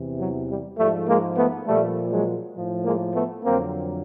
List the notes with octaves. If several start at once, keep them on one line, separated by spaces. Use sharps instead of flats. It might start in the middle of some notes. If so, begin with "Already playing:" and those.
Already playing: E2 C3 E3
F#3
G3
G#2 F3 G3 A3
G#3 A#3
A3 B3
A#2 F3 G3 A3
F#3 G#3
A2 F3
G#3 A#3
A3 B3
F2 D3 F#3 A#3 C4